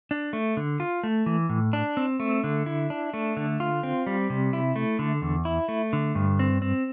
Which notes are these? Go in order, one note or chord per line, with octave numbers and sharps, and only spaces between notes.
D4
A3
D3
F4
A3
E3
A2
D4
C4
A3
D3
E4
D4
A3
D3
F4
C4
G3
C3
E4
A3
D3
E2
E4
A3
D3
G2
C4
C4